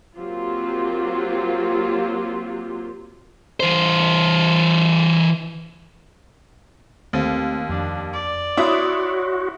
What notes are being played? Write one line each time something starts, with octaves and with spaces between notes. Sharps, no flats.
F#3 A#3 C4 F4 G4
E3 C5
D#2 A3 C4
F2 D4
D5
E4 F#4 C#5 E5 B5 C6 D#6